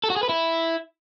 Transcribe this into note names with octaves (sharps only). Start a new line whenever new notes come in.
A4
F#4
G#4
B4
E4